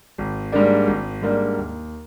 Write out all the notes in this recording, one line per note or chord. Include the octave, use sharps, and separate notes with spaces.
G#1
G#2 G3 A#3 D4
G#1
G#2 G3 A#3 D4
D#2